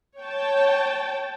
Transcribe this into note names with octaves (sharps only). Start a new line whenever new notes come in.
C#5 G5 A5